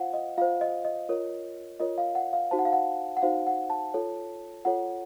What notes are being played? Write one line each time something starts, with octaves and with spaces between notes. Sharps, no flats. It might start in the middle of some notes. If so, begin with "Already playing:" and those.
Already playing: F4 C5 F5 F#5
D#5
F4 C5 F5
D#5
D#5
F4 A#4 C#5
F4 A#4 C#5 D#5
F5
F#5
F5
D#4 F#4 C5 A5
F#5
F5
F#5
F#5
D#4 F#4 C5 F5
F#5
A5
F4 A4 C#5
F4 A4 C#5 F#5